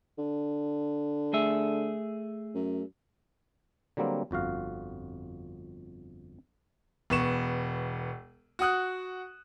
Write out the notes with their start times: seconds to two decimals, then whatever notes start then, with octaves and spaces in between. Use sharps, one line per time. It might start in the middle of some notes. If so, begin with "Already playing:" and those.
0.18 D3
1.33 A3 G#4 E5
2.55 F#2
3.97 D3 F#3 G3 A#3 C4
4.31 G1 F2 F#4 F5
7.10 E1 B3 C#6 E7
8.59 F#4 F#5 D#6 F#6